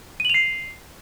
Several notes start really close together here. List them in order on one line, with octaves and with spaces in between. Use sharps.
D#7 F#7 F7 C7